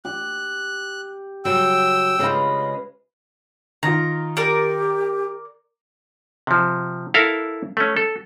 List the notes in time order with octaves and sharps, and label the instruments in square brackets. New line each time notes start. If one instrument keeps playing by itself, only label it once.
[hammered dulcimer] G4 [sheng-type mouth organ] F#6
[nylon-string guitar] C#3 F#3 G3 [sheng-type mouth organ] G5 E6
[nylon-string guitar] C#3 G#3 F4 [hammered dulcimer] B4 A#5
[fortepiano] D#3 F4 [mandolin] A#5
[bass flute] G4 [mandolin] A#4 D5
[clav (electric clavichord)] C3 F3
E4 A4 A#4 F5
A3 C#4
A4